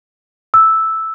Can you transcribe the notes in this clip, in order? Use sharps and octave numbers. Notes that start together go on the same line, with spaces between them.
E6